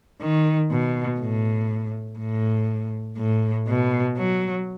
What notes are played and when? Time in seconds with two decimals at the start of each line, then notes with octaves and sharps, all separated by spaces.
0.22 D#3
0.71 B2
1.20 A2
2.19 A2
3.18 A2
3.69 B2
4.17 F#3